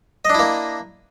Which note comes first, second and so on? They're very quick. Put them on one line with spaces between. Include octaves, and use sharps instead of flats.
D#5 D4 E4 A#3